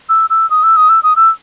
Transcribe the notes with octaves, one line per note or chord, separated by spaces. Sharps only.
E6
E6
D#6
E6
D#6
E6
D#6
E6